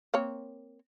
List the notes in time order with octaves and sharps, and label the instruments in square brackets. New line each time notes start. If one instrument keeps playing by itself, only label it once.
[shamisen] A#3 C4 C#5